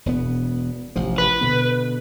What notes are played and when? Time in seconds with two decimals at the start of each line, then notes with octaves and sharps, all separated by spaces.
0.06 E1 B2 B3
0.96 A1 C3 F3
1.18 B4
1.41 B2 D3 B3